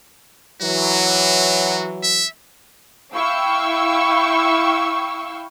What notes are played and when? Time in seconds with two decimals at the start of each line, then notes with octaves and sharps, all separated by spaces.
0.61 E3 F#3 F#4
2.03 E5
3.13 E4 F5 G5 C#6 E6